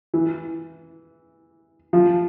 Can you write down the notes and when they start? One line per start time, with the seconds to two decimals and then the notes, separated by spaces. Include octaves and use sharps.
0.14 E3
1.93 F3